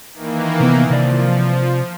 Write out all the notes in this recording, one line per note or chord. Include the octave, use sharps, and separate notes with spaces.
D#3 E3 A#3
C3 B3
C3 F3 D5